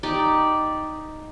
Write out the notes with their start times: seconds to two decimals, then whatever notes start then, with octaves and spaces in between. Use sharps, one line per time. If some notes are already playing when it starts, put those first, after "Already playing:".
0.03 D#4 G4 D5